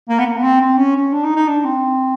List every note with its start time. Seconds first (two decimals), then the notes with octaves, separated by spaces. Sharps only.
0.09 A#3
0.19 B3
0.26 A#3
0.37 B3
0.43 C4
0.61 C4
0.78 C#4
0.96 C#4
1.13 D4
1.24 D#4
1.36 D#4
1.48 D4
1.65 C4